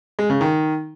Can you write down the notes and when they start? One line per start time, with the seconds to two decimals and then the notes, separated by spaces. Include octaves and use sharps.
0.19 G#3
0.30 C#3
0.41 D#3